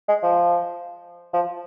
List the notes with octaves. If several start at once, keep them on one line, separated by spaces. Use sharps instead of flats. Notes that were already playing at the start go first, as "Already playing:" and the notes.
G#3
F3
F3